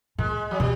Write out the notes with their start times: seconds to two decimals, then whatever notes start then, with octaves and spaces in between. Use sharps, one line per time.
0.18 A#2 G#3
0.51 F#3
0.60 B2 G3